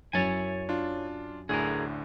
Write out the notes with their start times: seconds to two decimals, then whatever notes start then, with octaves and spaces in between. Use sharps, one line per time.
0.13 F#2 E4 C#5 G#5 A6
0.69 D4 F4
1.49 D2 A2 D3 G#4 A#4